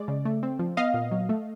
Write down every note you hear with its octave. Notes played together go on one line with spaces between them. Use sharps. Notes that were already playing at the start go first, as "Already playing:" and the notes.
Already playing: G#3 D5
C#3
A3
C4
F3
B3 D#5 F5
A#2
F#3
A3